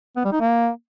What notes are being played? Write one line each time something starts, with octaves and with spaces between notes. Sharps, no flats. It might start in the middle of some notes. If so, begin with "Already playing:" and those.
B3
G3
D#4
A#3